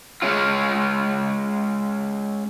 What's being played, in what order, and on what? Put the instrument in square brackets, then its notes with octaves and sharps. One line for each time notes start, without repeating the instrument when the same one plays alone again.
[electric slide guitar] G#3 C#4 F4